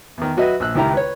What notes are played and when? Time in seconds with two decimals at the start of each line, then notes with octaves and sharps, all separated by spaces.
0.17 E2 D#3
0.37 F#3 F#4 B4 D#5 E5
0.60 A#1 E6 F#6
0.75 C#2 D#3 E4 G4 A#5
0.93 B4 C#5